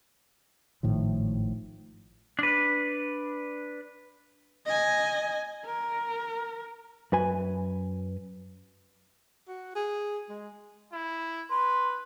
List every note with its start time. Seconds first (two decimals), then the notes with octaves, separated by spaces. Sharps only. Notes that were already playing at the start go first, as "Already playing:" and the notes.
0.83 G#1 A2 D#3 F3
2.39 D4 B4
4.66 D#5 G#5
5.66 A#4
7.12 F#2 B4 G#5
9.48 F#4
9.75 G#4
10.29 G#3
10.93 E4
11.50 B4 C6